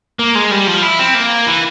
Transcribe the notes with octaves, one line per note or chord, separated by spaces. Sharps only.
A#3
G#3
G3
F3
E4
C4
A#3
E3